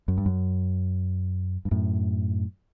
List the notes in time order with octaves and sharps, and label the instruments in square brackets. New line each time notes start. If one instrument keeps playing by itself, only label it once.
[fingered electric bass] F#2
G2
F#2
G2
F#2 A2